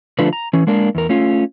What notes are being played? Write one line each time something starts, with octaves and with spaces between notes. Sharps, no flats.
D3 F3 A3 D4 F4 B4
A#5
E3 C#4
G#3 A#3 D4 A#4
E2 A#4
A3 C#4 F4